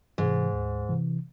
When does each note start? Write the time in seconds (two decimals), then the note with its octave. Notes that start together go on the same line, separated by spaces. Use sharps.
0.18 G#2 C3 E3
0.54 D2
0.89 C3 E3